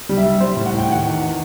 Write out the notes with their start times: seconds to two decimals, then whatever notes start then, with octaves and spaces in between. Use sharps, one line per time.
0.09 G3
0.17 E5
0.26 G3
0.40 G3 C5
0.56 A2
0.66 F#5
0.73 A2 G5
0.89 D#3 F#5
1.05 E2
1.20 D#3